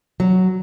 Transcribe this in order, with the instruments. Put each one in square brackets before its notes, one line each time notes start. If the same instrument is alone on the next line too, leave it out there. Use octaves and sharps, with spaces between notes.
[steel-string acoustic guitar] F#3